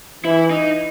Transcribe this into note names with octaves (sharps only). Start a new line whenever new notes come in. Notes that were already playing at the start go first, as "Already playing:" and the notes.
E3 E4
D#4